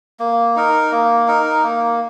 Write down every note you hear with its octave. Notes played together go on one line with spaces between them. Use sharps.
A#3
D#4 A#4
A#3
D#4 A#4
A#3